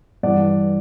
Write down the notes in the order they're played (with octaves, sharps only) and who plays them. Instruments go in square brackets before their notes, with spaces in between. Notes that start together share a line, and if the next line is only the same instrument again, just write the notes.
[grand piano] G2 E3 D5 F#5